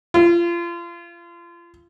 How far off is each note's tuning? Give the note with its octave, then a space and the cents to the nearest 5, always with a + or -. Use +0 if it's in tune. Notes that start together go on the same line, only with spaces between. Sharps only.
F4 -30